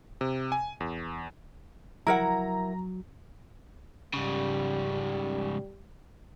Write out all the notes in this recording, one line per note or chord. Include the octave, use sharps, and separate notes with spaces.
C3
G#5
E2
F#3 E4 A#4 F#5 A#5
G#2 C#3 G3